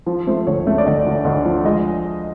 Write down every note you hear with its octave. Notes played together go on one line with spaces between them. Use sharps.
F3
A3 C5
D2 C#5
A3
D5
D2 D#5
D2
D2 D#5
F3
G#3 D#5